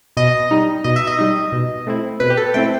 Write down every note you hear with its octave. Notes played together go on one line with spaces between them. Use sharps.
B2 D#5
G3 D#4
B2 D#5
E5
D#5
G3 D#4
B2
A3 C4 E4
B2 B4
G4
A4
A3 C4 E4 G5